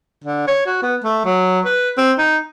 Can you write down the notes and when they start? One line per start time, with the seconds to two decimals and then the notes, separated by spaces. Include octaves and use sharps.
0.24 D3
0.47 C#5
0.66 F#4
0.82 B3
1.04 A3
1.25 F#3
1.65 B4
1.97 C4
2.18 D#4